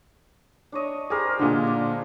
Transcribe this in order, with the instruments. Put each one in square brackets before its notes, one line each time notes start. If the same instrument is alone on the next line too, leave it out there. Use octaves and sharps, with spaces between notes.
[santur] D4 C#5 D#5
[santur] G4 A#4 C5 [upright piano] G#4
[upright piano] A#2 D3 [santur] G#3 G#4
[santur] D4